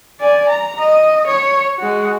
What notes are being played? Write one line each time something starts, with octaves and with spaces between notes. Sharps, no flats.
D5 G#5
A#5
D#5
C#5
G#3 F#4